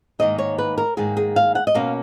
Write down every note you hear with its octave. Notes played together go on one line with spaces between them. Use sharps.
G#2 D#3 A#3 D#4 D#5
C#5
B4
A#4
G#2 D#3 A#3 D#4 G#4
G#4
F5
F#5
D#5
B2 A#3 C#4 F5